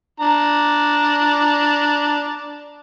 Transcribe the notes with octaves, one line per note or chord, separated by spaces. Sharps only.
D4 A#5